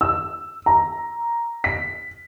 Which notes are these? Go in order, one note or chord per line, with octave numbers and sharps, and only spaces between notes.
E6
A#5
B6